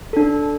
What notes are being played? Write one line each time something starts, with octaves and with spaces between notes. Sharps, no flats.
D4 A4